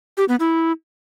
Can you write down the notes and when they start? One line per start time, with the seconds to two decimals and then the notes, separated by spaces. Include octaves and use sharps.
0.17 G4
0.29 B3
0.40 E4